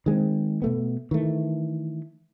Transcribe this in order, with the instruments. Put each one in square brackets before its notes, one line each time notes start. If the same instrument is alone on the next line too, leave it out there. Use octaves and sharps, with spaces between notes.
[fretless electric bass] D#3 G#3 A#3 C4
B2 A3 B3
D#3 E3 A3